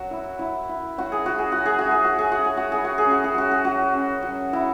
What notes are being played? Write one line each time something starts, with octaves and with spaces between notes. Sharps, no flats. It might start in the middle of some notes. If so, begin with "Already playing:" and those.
Already playing: F#3 F#4
E4
E4
E4
F#3 F#4
G#4
F#3 F#4
G#4
F#4
F#3
G#4
F#4
E4 G#4
F#4
F#3 G#4
F#4
F#3 G#4
F#4
E4 G#4
F#4
G#4
C#4
F#4
G#4
F#3 F#4
G#4
F#3 F#4
C#4
F#3
F#3 E4